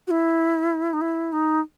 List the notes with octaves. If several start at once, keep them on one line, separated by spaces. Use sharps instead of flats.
F#4
E4
D#4
E4
D#4